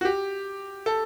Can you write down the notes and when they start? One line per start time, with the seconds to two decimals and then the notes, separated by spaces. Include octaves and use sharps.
0.01 F#4
0.05 G4
0.86 A4